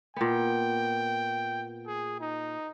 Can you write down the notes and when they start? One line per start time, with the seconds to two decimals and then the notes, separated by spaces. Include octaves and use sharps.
0.16 A#2 B3 G5
1.86 G#4
2.20 D#4